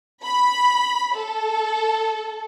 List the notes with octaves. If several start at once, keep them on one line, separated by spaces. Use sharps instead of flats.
B5
A4